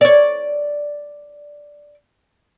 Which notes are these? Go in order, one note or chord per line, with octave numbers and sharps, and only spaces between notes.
C#5 D5